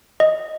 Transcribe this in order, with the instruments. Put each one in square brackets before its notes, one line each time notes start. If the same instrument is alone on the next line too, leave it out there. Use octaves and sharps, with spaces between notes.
[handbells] D#5